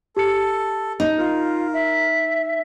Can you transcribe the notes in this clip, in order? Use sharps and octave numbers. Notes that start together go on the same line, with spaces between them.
G4 A4 C#7
D#4
F4 A#4
E5